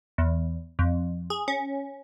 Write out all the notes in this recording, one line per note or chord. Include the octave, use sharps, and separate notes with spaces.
E2
F2
G#4
C#4